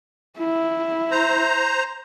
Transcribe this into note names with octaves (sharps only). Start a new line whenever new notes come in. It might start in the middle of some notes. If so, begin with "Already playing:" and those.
E4
C5 A#5